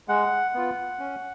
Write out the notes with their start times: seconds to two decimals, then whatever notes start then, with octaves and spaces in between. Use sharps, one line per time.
0.08 G#3 F#5
0.54 B3 F4
0.99 C#4